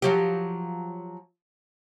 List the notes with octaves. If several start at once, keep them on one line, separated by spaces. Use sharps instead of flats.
F3 F#3 G4